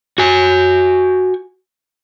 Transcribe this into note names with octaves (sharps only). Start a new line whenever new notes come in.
F#4 G#5